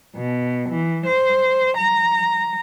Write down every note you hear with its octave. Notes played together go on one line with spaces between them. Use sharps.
B2
E3
C5
A#5